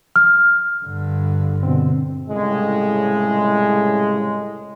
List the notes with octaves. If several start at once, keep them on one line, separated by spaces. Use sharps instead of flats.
F6
G2 D3
B2 D3 C4
C2 A2 C#3 G#3